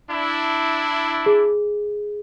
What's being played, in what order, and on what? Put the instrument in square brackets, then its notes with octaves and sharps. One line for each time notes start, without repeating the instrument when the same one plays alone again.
[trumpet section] D4 E4
[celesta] G#4